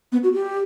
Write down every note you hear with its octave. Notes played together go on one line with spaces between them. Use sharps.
B3
F#4
G4